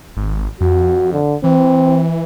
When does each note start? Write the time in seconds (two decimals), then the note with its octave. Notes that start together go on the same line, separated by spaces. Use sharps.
0.17 G#1
0.61 F2 F#4
1.13 D3
1.44 E3 C4